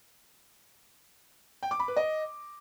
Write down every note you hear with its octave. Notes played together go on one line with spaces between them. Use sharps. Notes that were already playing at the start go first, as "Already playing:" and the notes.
G5
D6
B5
B4
D#5